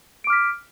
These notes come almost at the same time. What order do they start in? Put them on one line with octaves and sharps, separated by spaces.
D7 D6 F6 B6